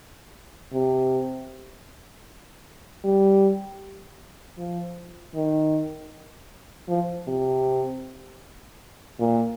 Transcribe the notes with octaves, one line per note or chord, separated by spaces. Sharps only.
C3
G3
F3
D#3
F3
C3
A#2